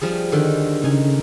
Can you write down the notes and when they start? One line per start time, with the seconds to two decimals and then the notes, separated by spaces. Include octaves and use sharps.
0.01 F3 G3 G#4
0.32 D3 D#3
0.84 C#3 D#4 G#5